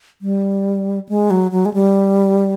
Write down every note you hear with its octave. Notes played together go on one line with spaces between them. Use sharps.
G3
G#3
F#3
F#3
G#3
G3